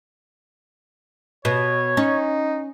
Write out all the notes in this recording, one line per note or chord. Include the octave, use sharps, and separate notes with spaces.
B2 C#5
C#4 D#4